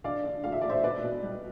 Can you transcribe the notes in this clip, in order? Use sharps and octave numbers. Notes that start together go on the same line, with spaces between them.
D3 D5 F5
D3
A3 F5
E5
A3 D5
C5 E5
B2 B4 D5
B2
G3